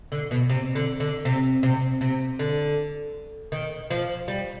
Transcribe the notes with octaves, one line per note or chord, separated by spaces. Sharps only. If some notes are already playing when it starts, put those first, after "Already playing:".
D3
B2
C3
D3
D3
C3
C3
C3
D3
D#3
F3
G3